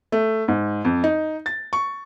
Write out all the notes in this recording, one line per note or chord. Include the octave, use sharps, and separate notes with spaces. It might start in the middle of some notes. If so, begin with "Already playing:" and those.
A3
G#2
F2
D#4
A6
C#6